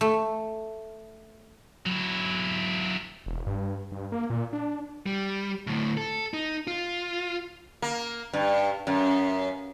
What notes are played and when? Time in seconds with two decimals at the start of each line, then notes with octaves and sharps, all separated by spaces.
0.01 A3
1.86 F#3 E4
3.26 E1
3.47 G2
3.92 G2
4.12 A#3
4.30 A#2
4.53 D4
5.06 G3
5.67 D2 A2
5.97 A4
6.34 D#4
6.67 F4
7.82 A#3
8.33 G2
8.87 F#2